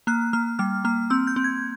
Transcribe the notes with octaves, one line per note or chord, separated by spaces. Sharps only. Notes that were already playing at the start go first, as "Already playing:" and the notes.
A#3 F#6
A#3 F6
G3 F6
A#3 F6
C4 E6
G6
C4
G#6